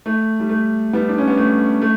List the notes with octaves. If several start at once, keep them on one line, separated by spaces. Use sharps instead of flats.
A3
G3
A3
G3 B3
D4
C#4
B3
A3
A3